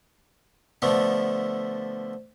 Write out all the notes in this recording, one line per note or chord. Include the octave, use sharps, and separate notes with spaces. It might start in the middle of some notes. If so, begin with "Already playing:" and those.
D3 F3 A3 B3 D4